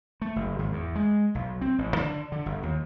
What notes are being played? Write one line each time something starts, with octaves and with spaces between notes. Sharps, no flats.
A3
F#1
G#1
E2
G#3
B1
C4
A1
D3
D3
G1
D#2